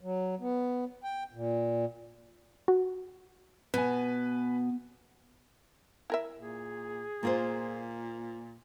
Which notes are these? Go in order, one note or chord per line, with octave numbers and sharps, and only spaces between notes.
F#3
B3
G5
A#2
F#4
B2 B4 G#5 E7
E4 A#4 E5
A#2 G#4
A#2 A#3 F4 C5